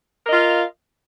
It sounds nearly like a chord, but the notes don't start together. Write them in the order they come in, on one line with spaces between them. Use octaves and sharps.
A#4 D#5 F4 F5